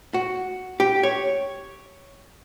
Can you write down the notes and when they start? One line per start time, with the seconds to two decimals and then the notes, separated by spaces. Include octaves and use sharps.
0.14 F#4
0.80 G4
1.03 C#5